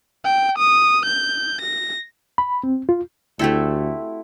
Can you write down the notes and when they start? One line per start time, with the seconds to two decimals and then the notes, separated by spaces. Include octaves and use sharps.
0.25 G5
0.58 D#6
1.06 G6
1.61 A#6
2.38 B5
2.63 C4
2.89 F4
3.39 D2 A3 C4 E4 F#4 G4 A4